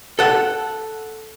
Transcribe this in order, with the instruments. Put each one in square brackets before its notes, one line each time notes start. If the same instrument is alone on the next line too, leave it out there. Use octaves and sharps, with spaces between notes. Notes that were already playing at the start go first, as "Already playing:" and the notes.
[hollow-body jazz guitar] A4 F#5